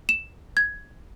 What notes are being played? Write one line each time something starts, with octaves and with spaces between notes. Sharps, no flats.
E7
G#6